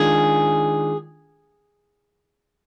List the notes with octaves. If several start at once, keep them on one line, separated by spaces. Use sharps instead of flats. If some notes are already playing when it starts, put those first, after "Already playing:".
Already playing: D#3 G#3 D4 F4 G#4